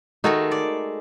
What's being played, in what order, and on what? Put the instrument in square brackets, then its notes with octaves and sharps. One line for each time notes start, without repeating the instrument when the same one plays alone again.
[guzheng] D#3 G#3 A3 [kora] D#4 F#4 A4
[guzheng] D5